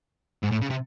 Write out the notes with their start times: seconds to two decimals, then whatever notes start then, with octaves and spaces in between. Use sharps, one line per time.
0.43 G#2
0.51 A2
0.61 C#3
0.70 C3